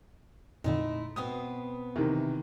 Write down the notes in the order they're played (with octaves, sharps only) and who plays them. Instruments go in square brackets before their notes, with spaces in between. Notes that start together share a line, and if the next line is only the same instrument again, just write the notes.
[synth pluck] F2 A#2 D3 [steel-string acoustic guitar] G#3 A3 E4 [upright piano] D#4
[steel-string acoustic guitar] B2 B3 C4 [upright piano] D#6
[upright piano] C3 D#3 E3